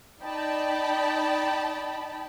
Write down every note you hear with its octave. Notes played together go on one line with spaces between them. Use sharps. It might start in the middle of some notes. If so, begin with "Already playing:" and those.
D#4 D5 G5 A5 B5